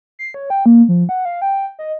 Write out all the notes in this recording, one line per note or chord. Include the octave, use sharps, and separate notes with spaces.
C7
C#5
G5
A#3
F3
F#5
F5
G5
D#5